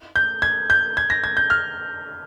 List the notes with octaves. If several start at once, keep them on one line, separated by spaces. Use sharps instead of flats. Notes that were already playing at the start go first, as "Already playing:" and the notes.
G6
G#6
G6
G#6
A#6
G#6
G6
F6